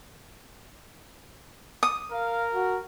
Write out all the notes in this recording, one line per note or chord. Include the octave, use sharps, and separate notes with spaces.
D#6
A#4 F5
F#4